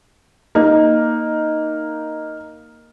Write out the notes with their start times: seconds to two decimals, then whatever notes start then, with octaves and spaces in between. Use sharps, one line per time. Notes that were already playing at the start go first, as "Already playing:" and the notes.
0.55 A#3 D#4